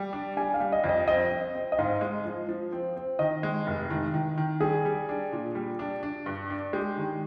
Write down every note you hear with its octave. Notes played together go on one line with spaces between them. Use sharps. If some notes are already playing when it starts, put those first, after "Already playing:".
Already playing: G3
D4
G3 G#5
F5
G3
D#5
F2
D#5
C4 D#5
C4
C4
D#5
G#2 F5
G#3
F3
F3
C4
C4
D#3 D#5
G#3
F1
D#3
D#3
D#3
G3 G#4
G3
D4
A#2
G3
D4
D4
G2
D4
G#3 G4
D#3